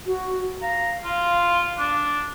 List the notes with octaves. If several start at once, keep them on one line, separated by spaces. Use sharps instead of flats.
F#4
F5 A#5
F4
D4